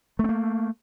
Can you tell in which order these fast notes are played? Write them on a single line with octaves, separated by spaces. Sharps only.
A3 C4 A#3